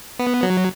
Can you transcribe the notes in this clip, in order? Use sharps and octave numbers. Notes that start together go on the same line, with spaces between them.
B3
F#3